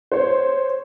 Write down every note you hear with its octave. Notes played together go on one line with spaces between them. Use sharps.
C5 C#5